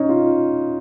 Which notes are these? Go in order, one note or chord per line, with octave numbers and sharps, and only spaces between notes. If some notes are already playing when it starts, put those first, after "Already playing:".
Already playing: C#4 D#4
F4